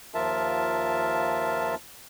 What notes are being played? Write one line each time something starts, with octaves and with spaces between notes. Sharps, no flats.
D#2 F3 F4 A#4 E5 A5